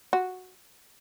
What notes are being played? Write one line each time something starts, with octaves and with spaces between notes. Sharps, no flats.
F#4